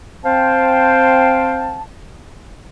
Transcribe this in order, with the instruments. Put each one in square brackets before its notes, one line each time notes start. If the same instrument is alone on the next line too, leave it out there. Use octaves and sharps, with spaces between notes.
[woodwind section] C4 C5 F5 G5 A5